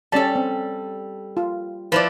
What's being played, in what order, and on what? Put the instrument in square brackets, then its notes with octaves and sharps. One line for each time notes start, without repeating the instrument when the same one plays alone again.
[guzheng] G3 A4 [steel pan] C#4 D5 A5
[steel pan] C4
F4
[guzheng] F3 E4 D5 [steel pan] B4